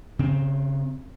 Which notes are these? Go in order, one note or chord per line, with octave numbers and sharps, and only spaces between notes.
C#3 C4